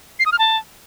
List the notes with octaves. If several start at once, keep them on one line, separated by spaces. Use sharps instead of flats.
C7
D#6
F6
A5